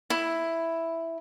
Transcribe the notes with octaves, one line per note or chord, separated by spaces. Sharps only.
E4